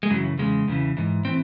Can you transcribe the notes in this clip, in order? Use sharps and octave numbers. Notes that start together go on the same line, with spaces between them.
G#3
F#2 C#3 E3 F#3
E2 C#3 G#3
E2 C#3 E3
G#2 E3
A2 E3 C4